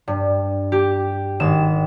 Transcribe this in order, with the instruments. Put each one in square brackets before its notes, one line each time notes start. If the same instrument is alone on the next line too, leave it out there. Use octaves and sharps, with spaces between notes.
[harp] G2
G4
G#1 E7